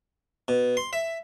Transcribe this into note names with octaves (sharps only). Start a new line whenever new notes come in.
B2
C6
E5